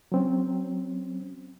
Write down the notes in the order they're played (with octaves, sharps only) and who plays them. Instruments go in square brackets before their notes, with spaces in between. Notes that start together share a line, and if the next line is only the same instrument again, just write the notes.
[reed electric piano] F#3 C4 C#4